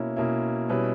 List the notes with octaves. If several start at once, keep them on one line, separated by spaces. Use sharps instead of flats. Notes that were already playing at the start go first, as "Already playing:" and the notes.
Already playing: B2 A#3 C#4 E4
B2 A#3 C#4 E4
B2 G3 C#4 E4 B4